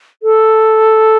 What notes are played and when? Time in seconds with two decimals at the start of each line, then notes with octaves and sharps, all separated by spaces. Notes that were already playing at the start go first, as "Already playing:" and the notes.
0.23 A4